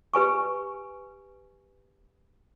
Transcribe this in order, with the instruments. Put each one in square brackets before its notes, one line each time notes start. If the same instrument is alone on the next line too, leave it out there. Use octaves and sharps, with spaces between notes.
[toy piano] G4 B4 G#5 C#6